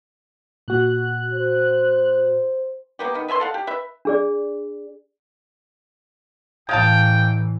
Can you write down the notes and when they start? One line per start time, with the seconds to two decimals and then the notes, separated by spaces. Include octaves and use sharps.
0.68 A#2 F#4 F#6
1.33 C5
2.99 A#3 B3 G4
3.14 D#3 B3
3.28 B4 E5 G#5 C6
3.40 A4 F5 F#5
3.54 G4
3.67 B4 E5
4.05 D4 G#4 D5
6.69 A1 E3 G#3 F5 G5 A5